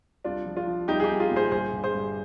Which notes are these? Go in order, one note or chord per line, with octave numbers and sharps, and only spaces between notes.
C2 D4 F4
F3
D4 F4
F3
C2 D#4 G4
G#4
D#4 G4
C2
F4 G#4
A#2
G#4 C5
G1 G#4 C5
G1
G#4 C5
G2